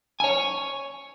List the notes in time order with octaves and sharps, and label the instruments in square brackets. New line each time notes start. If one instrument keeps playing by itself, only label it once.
[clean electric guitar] C#5 G#5